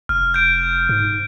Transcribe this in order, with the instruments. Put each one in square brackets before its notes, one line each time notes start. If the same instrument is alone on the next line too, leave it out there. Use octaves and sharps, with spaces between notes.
[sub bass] F1 [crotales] F6
[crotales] G6 D7
[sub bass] G#2